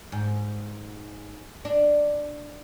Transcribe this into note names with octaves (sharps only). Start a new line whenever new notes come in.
G#2
D4